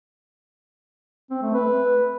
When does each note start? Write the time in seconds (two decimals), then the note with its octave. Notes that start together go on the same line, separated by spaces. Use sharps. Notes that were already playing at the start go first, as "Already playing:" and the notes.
1.31 C4
1.42 A3
1.54 B4